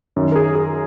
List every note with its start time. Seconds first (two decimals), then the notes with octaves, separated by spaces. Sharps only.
0.16 F#2 D#3
0.32 A#4
0.36 G#4
0.55 G#4